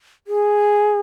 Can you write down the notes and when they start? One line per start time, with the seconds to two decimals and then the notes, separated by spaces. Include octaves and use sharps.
0.27 G#4